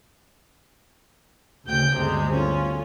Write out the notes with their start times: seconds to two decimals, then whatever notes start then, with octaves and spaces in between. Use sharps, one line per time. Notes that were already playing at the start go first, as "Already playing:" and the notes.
1.67 D2 C#3 G5 G6
1.96 G1 D2 C3 G#3
2.33 C#4 F4